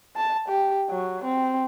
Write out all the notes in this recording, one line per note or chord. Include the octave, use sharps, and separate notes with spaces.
A5
G4
F#3
C4